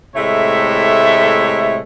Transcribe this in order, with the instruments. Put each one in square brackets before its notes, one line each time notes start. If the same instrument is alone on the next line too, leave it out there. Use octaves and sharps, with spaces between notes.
[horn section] A2 C3 G#3 A3 C#5 E5